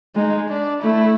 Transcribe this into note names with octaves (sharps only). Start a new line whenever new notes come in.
G#3 D#4
D4
A3 E4